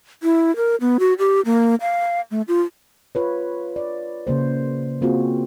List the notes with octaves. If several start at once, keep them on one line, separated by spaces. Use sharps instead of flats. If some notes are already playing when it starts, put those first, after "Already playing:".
E4
A#4
B3
F#4
G4
A#3
F5
A3
F4
F4 B4 C#5
D5
C#3 A#3 C5
A#3 C4 F4 F#4 G#4